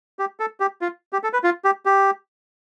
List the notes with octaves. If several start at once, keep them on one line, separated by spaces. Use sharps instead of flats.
G4
A4
G4
F4
G4
A4
B4
F4
G4
G4